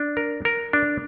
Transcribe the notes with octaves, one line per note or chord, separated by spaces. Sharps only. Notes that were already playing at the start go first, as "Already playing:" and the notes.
Already playing: D4
A#4
A#4
D4